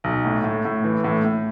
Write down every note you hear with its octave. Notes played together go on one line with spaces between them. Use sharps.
B1
A2
A2
A2
E3
A2
A2